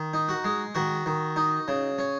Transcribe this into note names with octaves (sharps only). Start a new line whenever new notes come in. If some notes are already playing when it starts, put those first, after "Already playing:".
Already playing: D#3
D#4
F#4
G#3
D#3 F#4
D#3
D#4
C#3
C#4